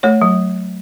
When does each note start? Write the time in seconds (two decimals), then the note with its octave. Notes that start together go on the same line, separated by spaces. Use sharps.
0.03 A3 C#5
0.22 F#3